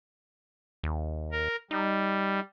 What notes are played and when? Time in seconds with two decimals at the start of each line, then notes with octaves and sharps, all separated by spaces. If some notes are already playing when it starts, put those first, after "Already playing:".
0.83 D#2
1.32 A#4
1.71 G3 D#4